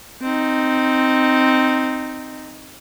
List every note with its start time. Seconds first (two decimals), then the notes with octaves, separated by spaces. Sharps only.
0.22 C4 D#4